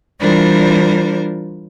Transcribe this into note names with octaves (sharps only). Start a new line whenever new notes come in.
E3 G3 D4 F4 A#4 C5